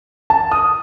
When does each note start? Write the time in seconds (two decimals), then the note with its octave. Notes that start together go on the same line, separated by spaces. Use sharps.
0.30 A5
0.52 D#6